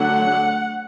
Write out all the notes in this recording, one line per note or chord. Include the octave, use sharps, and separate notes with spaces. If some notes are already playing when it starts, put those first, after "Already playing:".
Already playing: D3 F#3 A3 D4 F#5